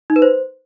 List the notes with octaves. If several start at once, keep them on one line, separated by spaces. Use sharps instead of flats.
D#4
B4
C5